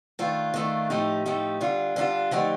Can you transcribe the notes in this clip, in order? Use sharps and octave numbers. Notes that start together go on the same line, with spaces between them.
D#3 A3 D4 F4
D#3 A3 D4 F4
A2 F3 A3 D#4 G4
A2 F3 A3 D#4 G4
D3 G3 D4 F4
D3 G3 D4 F4
D3 F3 A3 D#4 G4